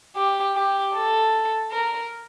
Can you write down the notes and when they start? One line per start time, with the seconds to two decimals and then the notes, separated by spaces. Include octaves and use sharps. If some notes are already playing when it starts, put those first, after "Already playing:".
0.16 G4
0.55 G4
0.94 A4
1.71 A#4